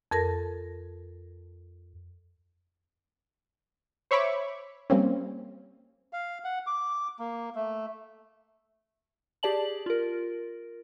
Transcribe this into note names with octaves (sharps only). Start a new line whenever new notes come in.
F2 A4 A#4 A5 A#6
C5 C#5 E5 B5 C#6 D6
G3 A#3 C4 C#4
F5
F#5
D6
A#3
A3
G4 G#4 D5 A5 F#7
F4 A#4